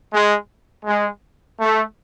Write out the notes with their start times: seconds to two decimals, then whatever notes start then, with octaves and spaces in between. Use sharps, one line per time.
0.13 G#3
0.86 G#3
1.59 A3